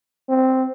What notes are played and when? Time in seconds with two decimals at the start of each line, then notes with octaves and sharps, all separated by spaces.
0.29 C4